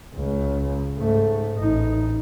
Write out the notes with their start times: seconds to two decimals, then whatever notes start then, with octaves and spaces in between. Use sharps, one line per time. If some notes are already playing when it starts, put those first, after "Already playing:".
0.14 C#2
0.96 G#2 A3
1.55 A1 D#4